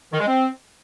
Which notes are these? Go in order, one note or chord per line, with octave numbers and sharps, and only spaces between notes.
D#3
G#3
C4